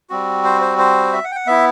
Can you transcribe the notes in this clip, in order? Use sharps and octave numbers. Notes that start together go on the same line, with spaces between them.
G3 C4 F#4
C5
C5
C5
E5
F#5
G5
F#5
B3 E4 E5